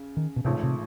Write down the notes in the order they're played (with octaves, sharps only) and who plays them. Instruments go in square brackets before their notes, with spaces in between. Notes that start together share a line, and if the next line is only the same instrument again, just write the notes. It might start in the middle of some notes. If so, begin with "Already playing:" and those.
Already playing: [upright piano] C#3
[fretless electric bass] D#3
B2
[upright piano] A1 G#2 F3 A3 [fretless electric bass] C3
[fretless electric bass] C3